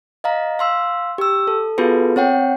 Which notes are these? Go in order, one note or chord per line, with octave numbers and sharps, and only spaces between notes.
D#5 F5 A#5
F5 C6 E6
G4 E6
A4
B3 F4 F#4 G#4 A4 B4
C4 C#5 F#5 G5